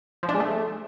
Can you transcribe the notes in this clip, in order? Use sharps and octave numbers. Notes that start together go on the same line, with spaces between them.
F3
D4
G#3
A3